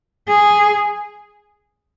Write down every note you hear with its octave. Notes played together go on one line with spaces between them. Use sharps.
G#4